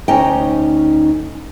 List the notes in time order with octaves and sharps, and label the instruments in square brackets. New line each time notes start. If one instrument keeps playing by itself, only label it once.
[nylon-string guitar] D2 C#4 D#4 G5